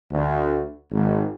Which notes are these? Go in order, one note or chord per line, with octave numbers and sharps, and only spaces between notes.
D2
G#1